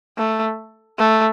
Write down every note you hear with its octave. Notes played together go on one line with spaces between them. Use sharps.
A3
A3